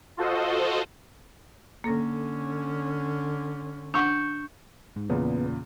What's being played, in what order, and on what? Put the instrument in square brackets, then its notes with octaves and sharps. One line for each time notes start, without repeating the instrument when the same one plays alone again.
[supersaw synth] F4 F#4 A4 C5 D#5
[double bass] D3 C#4 [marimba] A#3 A4 A#6
[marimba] D4 F#5 [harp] C#6 E6 G6
[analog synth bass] G#2
[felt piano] E2 A#2 C#3 [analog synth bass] B3